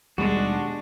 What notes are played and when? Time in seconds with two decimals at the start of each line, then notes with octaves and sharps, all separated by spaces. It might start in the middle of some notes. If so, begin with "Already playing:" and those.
0.18 D#2 B2 G3 G#3 D4 F#4